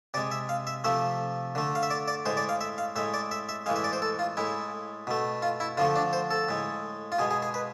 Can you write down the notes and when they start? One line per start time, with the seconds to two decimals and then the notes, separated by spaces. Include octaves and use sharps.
0.14 C3 D5
0.17 G#3
0.31 E5
0.49 F5
0.67 E5
0.84 C3 F3 A3 E5
1.55 D3 A3
1.75 F5
1.83 E5
1.90 D5
2.08 D5
2.26 A2 G#3 C5
2.37 D5
2.49 F5
2.61 E5
2.78 F5
2.96 A2 G#3 E5
3.14 D5
3.31 E5
3.49 E5
3.66 A2 E3 G#3 F5
3.76 E5
3.84 D5
3.93 C5
4.02 A4
4.19 F4
4.37 A2 G#3 E4
5.07 B2 A3
5.42 F4
5.60 E4
5.77 D3 F3 A3 F4
5.95 D4
6.13 C5
6.31 A4
6.49 A2 G#3
7.12 F4
7.19 B2 G#3 G#4
7.31 G#4
7.42 G#4
7.54 B4